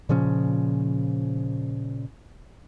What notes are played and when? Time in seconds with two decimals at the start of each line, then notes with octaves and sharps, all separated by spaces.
0.09 A#2 C#3 F3 C#4